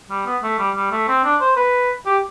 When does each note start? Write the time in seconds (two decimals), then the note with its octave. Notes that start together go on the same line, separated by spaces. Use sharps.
0.10 G3
0.26 B3
0.43 A3
0.59 G3
0.75 G3
0.92 A3
1.08 C4
1.24 D4
1.41 C5
1.57 B4
2.06 G4